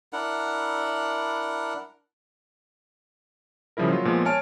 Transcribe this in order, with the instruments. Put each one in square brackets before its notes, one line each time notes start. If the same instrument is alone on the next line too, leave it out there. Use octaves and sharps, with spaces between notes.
[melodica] D4 E4 A#4 F#5
[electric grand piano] C#3 F3 G3 E4 A#4
A#2 F#3 F4
A#2 F3 G#3 B3
C#5 G#5 A5 F6 D7